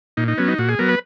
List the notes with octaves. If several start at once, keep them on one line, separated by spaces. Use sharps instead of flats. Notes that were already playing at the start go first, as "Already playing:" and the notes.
A#2 D#4
D#4
F#3 B3 C#4
D#4
A#2 F#4
G#4
F#3 B3 A#4
B4